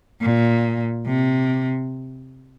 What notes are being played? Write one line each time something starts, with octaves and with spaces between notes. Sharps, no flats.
A#2
C3